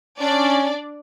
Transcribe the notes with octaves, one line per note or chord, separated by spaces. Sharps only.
C#4 D4 D5